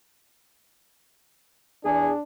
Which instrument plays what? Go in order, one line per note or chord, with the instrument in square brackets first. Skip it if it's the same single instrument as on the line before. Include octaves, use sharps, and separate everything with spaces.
[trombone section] E2 G#4 [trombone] D4